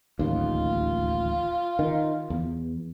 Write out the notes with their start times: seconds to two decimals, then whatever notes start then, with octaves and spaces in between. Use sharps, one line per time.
0.19 D1 A1 D#2 F4
1.79 D#3
2.30 E2